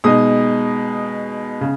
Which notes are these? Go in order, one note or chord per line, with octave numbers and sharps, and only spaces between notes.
B2 G#3 D#4 D#6
C#3